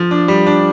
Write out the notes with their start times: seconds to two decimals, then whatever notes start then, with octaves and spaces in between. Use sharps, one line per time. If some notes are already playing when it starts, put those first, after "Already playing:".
Already playing: F3
0.11 D4
0.28 G3
0.46 D4